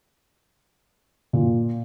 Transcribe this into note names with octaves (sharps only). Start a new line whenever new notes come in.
A#2